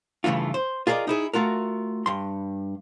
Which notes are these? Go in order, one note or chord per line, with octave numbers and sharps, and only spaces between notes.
G2 C#3 E3 A3 F4
C5
F4 G#4 A#4 C5 D5 D#5
D#4 E4 G#4
A3 F4 F#4 A#4
G2 C6